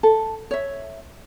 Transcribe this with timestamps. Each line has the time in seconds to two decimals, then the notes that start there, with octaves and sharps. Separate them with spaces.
0.03 A4
0.51 C#5 E5